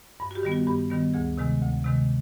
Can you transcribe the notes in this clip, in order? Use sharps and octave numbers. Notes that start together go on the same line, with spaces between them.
G2
F#4
G4
D#3 G3 B3
F#4
G2 G4
D#3 G3 B3
D2 G#4
C3 D#3 G#3
D2
C3 D#3 G#3